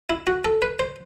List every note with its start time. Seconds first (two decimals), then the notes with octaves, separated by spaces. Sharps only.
0.10 E4
0.27 F#4
0.45 A4
0.62 B4
0.79 C5